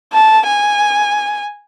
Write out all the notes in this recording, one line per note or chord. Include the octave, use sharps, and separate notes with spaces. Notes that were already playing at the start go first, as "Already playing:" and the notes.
A5
G#5